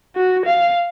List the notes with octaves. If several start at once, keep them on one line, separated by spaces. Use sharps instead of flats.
F#4
F5